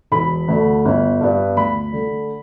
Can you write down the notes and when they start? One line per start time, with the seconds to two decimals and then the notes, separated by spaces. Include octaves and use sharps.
0.12 E1 B5
0.48 D2 D3
0.85 G1
1.21 G2 G3 B3
1.56 D2 B5
1.92 D3
1.98 A3